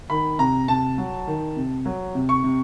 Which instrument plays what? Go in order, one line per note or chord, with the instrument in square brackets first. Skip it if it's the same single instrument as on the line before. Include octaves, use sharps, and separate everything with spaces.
[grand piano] D#3 B5
C3 A#5
C3 A5
F#3
D#3
C3
F#3
C3
C#6
C3